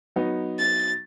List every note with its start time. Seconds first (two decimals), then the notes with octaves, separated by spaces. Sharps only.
0.16 F#3 B3 D#4
0.58 A6